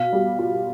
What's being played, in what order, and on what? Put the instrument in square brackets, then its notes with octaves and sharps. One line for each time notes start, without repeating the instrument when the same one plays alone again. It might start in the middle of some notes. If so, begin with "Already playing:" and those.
Already playing: [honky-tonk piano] B2 [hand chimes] F5
[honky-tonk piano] G3
F4